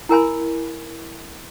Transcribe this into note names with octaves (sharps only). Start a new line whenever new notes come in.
E4 A#4 G#5 B5